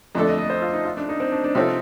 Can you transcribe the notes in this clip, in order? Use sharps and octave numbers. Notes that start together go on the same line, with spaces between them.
F2 D3 A3 D4 A4
D#5
D#5
C5
F4
D#4
F4
D4
D#4
C4
D4
D4
C3 F3 C4 D#4 F4 A4